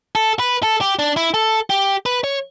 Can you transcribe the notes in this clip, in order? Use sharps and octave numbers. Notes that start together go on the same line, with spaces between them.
A4
B4
A4
G4
D4
E4
A4
G4
B4
C#5